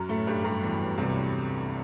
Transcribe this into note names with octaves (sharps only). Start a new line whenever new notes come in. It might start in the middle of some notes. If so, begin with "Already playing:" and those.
Already playing: F#2 F#3
A2 A3
G2 G3
G2 G3
E2 E3
C2 C3